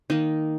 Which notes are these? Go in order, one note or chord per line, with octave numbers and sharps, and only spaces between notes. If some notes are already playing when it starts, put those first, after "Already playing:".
D#3 A#3 D#4